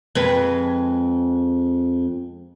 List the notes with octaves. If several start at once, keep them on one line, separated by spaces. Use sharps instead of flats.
F2 G#3 B4